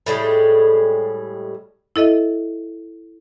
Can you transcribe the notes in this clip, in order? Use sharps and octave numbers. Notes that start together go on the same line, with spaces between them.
A2 G3 G#3 G#4
E4 A4 D#5 E5